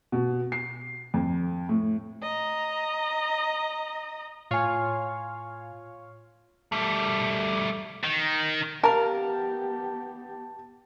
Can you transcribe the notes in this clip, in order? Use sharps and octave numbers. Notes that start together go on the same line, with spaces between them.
B2
C7
F2
A2
D#5 A#5
A2 F4 C#5 F5 G#5
G3 A3
D#3
B3 G4 A#4 F5 A5